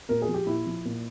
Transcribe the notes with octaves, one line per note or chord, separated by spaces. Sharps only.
A#2 A#4
G#4
F3
G4
A#2 E4
F3
A#2